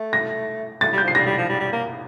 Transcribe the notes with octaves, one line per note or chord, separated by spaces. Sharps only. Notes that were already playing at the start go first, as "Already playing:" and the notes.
Already playing: A3
A#6
A3 A6
G3
G6
F3 C7
G3 A#6
G3
F3
G3
G3
A#3